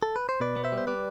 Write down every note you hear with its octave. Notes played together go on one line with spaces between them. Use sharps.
A4
B4
C5
B2 B4 D5
B3
C5 E5
G3
C5
G3 B4 D5